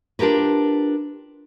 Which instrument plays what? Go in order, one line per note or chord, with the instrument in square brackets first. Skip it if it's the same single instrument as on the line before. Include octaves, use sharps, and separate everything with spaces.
[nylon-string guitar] D4 F4 G4 A#4 B4